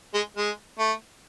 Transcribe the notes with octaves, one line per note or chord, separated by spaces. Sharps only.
G#3
G#3
A3